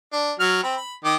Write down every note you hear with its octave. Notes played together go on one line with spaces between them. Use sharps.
D4
F#3 F6
C4 B5
B5
D#3 D#5 D6